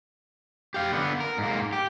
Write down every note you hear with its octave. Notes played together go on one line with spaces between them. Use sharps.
G4 F5
D3 B3
A#4
G#2 A#3
G4